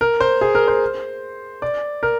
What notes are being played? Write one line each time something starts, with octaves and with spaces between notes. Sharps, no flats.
A#4
C5
G#4
A#4
C5
D5
A#4